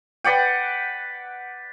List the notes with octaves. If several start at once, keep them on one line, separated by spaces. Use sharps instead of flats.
B4 D5 F#5 G5